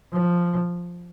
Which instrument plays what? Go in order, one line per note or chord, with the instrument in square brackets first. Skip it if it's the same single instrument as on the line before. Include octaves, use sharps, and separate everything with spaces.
[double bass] F3